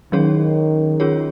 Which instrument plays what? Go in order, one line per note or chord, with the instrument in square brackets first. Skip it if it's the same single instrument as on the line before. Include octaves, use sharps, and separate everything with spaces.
[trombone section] D#3 [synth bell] F#3 C#4 G#4 C#5
[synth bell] C#4 F4 G#4 C#5